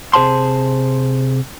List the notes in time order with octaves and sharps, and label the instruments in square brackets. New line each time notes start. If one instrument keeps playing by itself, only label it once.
[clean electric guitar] C3 G#4 C5 A5 C6